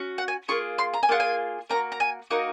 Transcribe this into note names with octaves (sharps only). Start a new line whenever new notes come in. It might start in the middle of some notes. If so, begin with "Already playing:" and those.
Already playing: C#4 F#4
F#5
G#5
A#3 F4 G#4 C#6
C6
A#5
G#5
A#3 F4 G#4 F#5
G#5
A#3 D#4 F#4 A#5
A#5
G#5
A#3 D#4 F#4 F#5